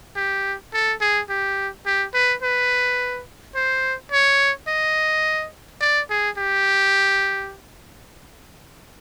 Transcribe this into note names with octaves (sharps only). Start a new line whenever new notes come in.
G4
A4
G#4
G4
G4
B4
B4
C5
C#5
D#5
D5
G#4
G4